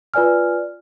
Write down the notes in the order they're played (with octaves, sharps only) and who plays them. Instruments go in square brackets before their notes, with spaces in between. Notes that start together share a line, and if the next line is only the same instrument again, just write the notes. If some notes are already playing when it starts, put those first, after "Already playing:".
[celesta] F4 B4 D5 G#5 F6